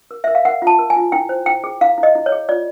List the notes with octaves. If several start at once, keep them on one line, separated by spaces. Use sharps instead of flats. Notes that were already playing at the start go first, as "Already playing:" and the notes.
A#4
A#4 E5
F5
A#4 F#5
F4 A5
A#4
G#5
F4
E4 G5
C5
E4 G5
G#4
E4 F5
E4
D#5
E4
C#5
G#4
F4 D5